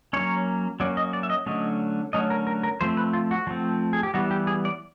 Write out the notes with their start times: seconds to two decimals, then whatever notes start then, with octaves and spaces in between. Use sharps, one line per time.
0.13 F#3 A#3 C#4 C#5
0.80 F#3 A#3 C#4 D5
0.97 D#5
1.13 D5
1.23 E5
1.30 D#5
1.46 D3 F#3 A3 C#4 D#5
2.13 D3 F#3 A3 C#4 D#5
2.30 A#4
2.47 A#4
2.63 A#4
2.81 F3 A3 C4 C5
2.97 B4
3.13 F4
3.31 F#4
3.47 F3 A3 C4
3.93 G#4
4.03 G4
4.14 E3 G3 B3 F#4
4.31 G4
4.47 G#4
4.65 D5